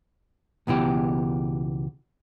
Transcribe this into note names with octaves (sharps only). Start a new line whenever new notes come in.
C#2 B2 E3 G4